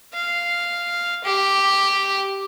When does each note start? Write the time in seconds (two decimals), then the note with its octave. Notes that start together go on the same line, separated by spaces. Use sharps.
0.14 F5
1.24 G4